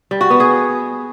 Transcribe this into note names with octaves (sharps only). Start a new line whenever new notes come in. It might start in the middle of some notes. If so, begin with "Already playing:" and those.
G3
F#4
B3
G#4